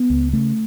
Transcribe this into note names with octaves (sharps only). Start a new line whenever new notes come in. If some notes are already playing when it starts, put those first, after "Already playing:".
Already playing: B3
C#2
C#3 A3